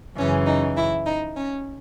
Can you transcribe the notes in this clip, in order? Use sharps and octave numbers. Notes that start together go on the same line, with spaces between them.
F#2 C#3 E3 C#4
D#4
E4
D#4
C#4